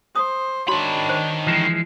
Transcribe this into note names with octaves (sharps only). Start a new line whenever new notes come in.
C5 D#6
D#3 D4 F#4 C#5 B5
C5
E3 F3 G#3